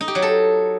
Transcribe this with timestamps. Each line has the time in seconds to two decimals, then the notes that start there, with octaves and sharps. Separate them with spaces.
0.01 D#4
0.08 G4
0.15 F#3
0.22 A4